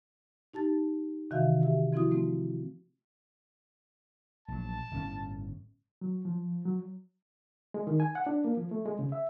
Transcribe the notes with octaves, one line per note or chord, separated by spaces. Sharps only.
D#4 G4 A5 A6
C3 D#3 E3 F#4 E5 F5
G4 E5
F3 C4 E4 F#4 D#6
A3 C4
A#1 F#3 A5
G1 A2 C#4
F#3
F3
F#3
G#3
D#3
G#5
F#5
D4
A#3
F3
A3
G#3
C#3
E5